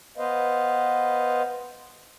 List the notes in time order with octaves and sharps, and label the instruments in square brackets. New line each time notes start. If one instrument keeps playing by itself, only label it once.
[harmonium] B3 B4 C5 D#5 F5